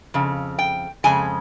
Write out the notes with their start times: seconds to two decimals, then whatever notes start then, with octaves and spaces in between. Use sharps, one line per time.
0.14 F2 C#3
0.59 G5
1.04 F2 C#3 G#3 G#5